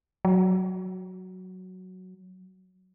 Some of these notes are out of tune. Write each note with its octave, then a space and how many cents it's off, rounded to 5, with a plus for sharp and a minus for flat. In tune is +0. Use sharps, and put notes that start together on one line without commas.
F#3 +0